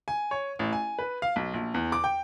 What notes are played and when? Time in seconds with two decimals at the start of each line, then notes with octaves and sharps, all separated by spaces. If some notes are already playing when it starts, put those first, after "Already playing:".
0.08 G#5
0.31 C#5
0.59 A1
0.73 G#5
0.99 B4
1.22 F5
1.36 B1
1.54 A#1
1.74 E2
1.92 D6
2.04 G5